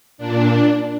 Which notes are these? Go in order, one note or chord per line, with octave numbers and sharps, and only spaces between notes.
A#2 D4